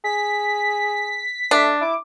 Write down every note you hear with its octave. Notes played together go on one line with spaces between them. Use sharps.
G#4 B6
A3 D4
E4 D6